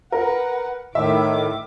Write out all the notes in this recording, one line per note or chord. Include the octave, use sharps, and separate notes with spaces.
A#4 B4 F#5
A2 D#3 E5 D6